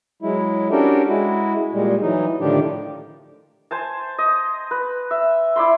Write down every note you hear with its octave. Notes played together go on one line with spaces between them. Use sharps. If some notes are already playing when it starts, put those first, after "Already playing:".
F#3 G#3 E4
C#4 D4 F#4 G4 A4 A#4
G#3 E4 F#4
A#2 G3 G#3
E3 F#3 D#4
A2 D3 D#3 F3 D4 G4
C5 G#5 A5
D#5
B4
E5
E4 D5 B5 C6